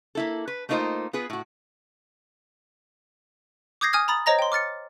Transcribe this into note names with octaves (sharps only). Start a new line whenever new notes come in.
A#3 E4 A4
B4
A3 A#3 D#4 F4 C5 D#5
B3 F4 G#4 B4
A2 F#4
D6 D#6 G6 G#6 A#6 C7
G#5 D#6 F6 G#6
A#5 B5 D#6 A6 F#7
C5 C#5 D#5 A#5 A#6
G5 C6
D6 F6 A6 C#7